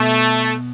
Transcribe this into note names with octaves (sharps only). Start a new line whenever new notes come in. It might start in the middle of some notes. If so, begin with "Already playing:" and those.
Already playing: B2 A3